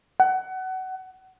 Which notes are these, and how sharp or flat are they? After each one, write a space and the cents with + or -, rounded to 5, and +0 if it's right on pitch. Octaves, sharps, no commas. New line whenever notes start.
F#5 +25